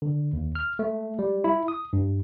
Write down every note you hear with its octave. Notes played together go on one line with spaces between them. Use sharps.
D3
D#2
F6
A3
G3
E4
D#6
G2